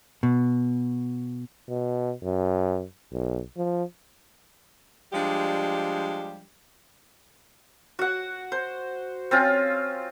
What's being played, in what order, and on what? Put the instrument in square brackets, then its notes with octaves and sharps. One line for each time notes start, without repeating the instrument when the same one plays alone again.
[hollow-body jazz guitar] B2
[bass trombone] B2
F#2
B1
F3
[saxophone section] F3 G3 G#3 D4 G4
[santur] F#4 F#5
C5
C4 C#4 F4